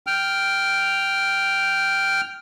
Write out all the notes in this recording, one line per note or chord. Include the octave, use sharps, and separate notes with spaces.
G5 F6